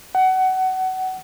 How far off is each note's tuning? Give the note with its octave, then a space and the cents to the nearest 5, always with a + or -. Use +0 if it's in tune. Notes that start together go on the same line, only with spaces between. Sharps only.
F#5 +25